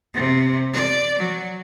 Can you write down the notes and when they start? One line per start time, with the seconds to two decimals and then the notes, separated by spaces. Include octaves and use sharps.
0.14 C3
0.73 D5
1.19 F#3